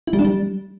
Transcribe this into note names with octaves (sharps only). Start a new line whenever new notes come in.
E4
G3
D4
G3